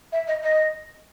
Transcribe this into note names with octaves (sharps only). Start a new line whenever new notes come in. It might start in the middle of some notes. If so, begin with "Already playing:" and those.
E5
D#5
D#5